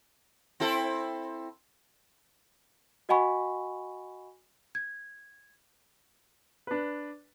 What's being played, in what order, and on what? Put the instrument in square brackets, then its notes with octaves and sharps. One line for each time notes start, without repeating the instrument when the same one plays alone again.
[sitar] C4 E4 A4
[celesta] F#4 D#5 F#5 G#5 B5 C#6
G#6
[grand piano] D4 B4